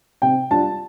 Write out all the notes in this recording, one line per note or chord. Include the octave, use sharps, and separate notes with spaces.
C3 G5
G3 D4 F4 A5